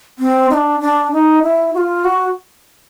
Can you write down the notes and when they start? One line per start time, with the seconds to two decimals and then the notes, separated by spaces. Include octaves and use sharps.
0.19 C4
0.50 D#4
0.54 D4
0.81 D4
1.12 D#4
1.43 E4
1.74 F#4
1.78 F4
2.05 F#4